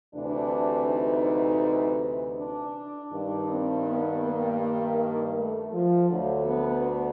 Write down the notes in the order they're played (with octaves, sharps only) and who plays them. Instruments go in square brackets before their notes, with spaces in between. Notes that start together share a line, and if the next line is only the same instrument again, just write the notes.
[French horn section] D2 C3 E3 D4
D#4
D4
G2 D#3 D4
C4
B3
A#3
A#3
A3
F3
D2 D3 F#3
B3